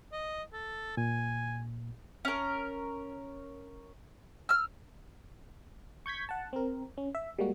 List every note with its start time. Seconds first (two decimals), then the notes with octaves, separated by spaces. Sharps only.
0.12 D#5
0.53 A4
0.97 A#2 G#5
2.25 C#4 A#4
4.49 E6 F6
6.06 C#6 G6 G#6 B6
6.29 F#5 A5
6.53 C4 A#4
6.97 C#4
7.15 E5
7.38 G3 G#3 A#3 F#4